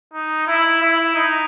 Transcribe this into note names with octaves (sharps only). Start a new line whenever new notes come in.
D#4
E4
E4
D#4